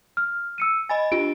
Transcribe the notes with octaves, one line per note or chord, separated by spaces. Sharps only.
F6
E6 C#7 D#7
D#5 G#5 B5 A6
D4 F4 G4 D7